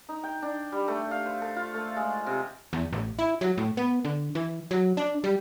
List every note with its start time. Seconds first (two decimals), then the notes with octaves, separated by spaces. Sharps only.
0.09 D#4
0.24 G5
0.42 D4
0.72 G3
0.88 A3
1.11 F5
1.26 C5
1.42 A4
1.56 F4
1.74 A3
1.97 G#3
2.26 C3
2.73 E2
2.93 A1
3.19 E4
3.41 F#3
3.58 A2
3.77 B3
4.05 D3
4.35 E3
4.71 F#3
4.97 D4
5.24 G3